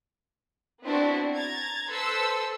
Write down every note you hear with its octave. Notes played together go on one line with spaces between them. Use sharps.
B3 C4 D4 E4 F#4
A#5 G#6 A6
A4 B4 C5 C6 E6 C#7